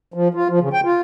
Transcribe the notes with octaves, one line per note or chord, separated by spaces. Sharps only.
F3
F4
F3
C#3
G5
F4